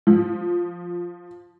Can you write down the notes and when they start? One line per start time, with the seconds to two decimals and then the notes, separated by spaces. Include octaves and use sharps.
0.07 F3